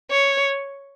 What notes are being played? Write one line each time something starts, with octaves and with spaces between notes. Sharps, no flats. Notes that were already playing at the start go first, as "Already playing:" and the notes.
C#5